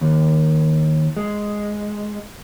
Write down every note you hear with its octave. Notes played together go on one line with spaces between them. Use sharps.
D#2
G#3